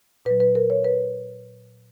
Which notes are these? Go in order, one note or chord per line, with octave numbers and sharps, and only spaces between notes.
A#2 F#3 B4
B4
A#4
C#5
B4